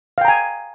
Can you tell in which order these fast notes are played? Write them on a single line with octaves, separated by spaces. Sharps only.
F5 G5 A#5 G#5